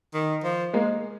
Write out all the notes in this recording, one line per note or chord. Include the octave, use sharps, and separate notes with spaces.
D#3
F3
G#3 A#3